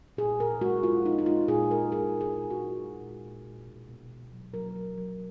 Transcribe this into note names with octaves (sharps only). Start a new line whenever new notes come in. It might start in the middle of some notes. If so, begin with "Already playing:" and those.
A#2 G#4
A#2 A#4
G#3 F#4
G#3 F4
G#3 D#4
D#4
G#3 F4
A#2 G#4
G#3 A#4
A#2 G#4
G#3
G#4
A#2
F#4
G#3
G#3
A#2
A#2
A#2
B2
B2
B2
F#3
F#3 A#4
F#3
F#3